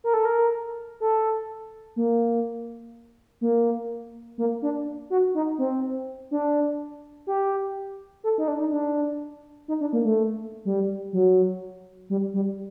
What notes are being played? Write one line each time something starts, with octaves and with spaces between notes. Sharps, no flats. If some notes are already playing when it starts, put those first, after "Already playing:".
A#4
A4
A#4
A4
A#3
A#3
A#3
D4
F#4
D#4
C4
D4
G4
A4
D#4
D4
D#4
D4
D#4
D4
A#3
A3
G3
F#3
G3
G3